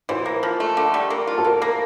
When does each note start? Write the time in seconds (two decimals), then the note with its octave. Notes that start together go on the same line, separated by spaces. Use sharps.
0.09 E3 C5
0.26 A#3
0.43 F3
0.60 A3
0.77 D3
0.94 G3
1.10 A#3
1.27 F4
1.38 A4
1.45 E3 A#4
1.62 A#3